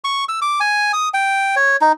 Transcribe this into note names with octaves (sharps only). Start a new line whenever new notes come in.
C#6
E6
D6
G#5
D#6
G5
C#5
D#4